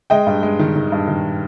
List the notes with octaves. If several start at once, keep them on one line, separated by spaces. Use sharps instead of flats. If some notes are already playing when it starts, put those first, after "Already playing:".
G#3 D#5 G5
G2
G#3
D#3
D#3
G2
D#3